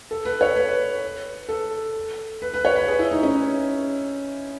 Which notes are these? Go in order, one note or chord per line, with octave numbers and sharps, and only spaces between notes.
A4
B4
C#5
B4
A4
B4
B4
C#5
B4
G#4
E4
D#4
C#4